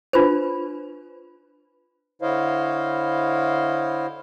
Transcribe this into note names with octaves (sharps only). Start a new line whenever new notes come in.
D4 F4 B4 C5
D3 E4 C5 C#5 D#5 F5